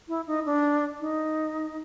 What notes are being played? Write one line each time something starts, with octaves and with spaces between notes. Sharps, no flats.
E4
D#4
D4
D#4